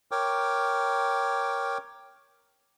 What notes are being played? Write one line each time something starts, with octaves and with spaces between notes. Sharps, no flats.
A#4 C#5 G5 D6